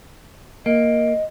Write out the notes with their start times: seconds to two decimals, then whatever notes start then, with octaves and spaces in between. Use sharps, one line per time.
0.66 A#3 D#5